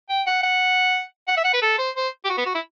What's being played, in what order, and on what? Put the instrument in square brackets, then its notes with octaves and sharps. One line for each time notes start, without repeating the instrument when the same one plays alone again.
[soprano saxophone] G5
F#5
F#5
F#5
E5
F#5
B4
A4
C5
C5
G4
F#4
B3
F#4
E4